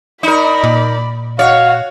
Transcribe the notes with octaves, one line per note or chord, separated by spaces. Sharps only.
D#4 A#4 D5 B5
A#2
F#4 C#5 F5 F#5